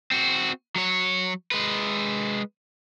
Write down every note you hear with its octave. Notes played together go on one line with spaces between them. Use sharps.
C4 F#4
F#3 C#5
G#3 B4